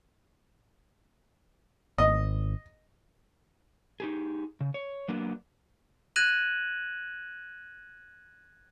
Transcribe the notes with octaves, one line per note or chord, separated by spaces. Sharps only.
G#1 D#5
D#4 G4 G#4
C#3
C#5
F#3 A#3 B3 D4
F#6 G#6 A#6 D#7 E7 F#7